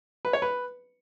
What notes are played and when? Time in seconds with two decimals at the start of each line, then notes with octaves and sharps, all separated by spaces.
0.25 B4
0.33 C#5
0.42 B4